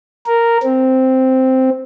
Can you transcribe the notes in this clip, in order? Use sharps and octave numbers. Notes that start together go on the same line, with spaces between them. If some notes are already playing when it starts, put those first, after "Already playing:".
A#4
C4